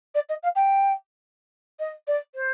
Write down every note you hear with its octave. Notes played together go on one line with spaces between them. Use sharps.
D5
D#5
F5
G5
D#5
D5
C5